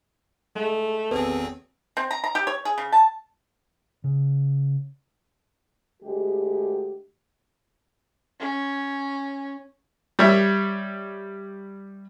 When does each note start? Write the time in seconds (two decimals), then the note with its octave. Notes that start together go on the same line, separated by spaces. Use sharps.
0.55 G#3 A3
1.11 G#1 E2 B3 C4 G#4 A4 B4 C#5
1.97 C4
2.11 A#5
2.24 A#5
2.35 G4
2.47 C#5
2.65 G#4
2.78 C#3
2.92 A5
4.04 C#3
6.03 D2 G#3 G4
8.40 C#4
10.19 G3 C#5 E5